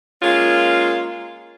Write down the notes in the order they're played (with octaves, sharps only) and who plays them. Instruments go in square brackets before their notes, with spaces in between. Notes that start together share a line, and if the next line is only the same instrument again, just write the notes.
[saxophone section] G#3 A#3 C#4 F4